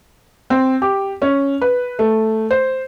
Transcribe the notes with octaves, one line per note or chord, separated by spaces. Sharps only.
C4
G4
C#4
B4
A3
C5